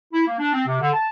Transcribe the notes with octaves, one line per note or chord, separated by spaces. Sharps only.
E4
A#3
D4
C4
C3
D3
A5